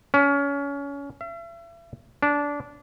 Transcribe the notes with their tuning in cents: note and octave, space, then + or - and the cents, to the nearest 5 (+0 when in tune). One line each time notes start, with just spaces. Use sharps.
C#4 +25
E5 +40
D4 -20